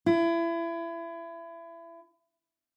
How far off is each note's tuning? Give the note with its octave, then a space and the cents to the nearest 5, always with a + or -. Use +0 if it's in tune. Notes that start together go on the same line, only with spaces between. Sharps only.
E4 +30